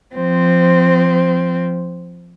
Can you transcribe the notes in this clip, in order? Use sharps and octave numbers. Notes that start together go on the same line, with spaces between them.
F3 C4